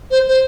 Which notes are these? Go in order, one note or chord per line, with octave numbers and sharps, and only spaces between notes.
C5
C5